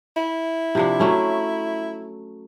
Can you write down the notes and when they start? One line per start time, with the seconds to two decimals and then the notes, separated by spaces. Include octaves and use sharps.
0.16 E4
0.75 C3 F3 D4
1.00 F#3 A3 C#4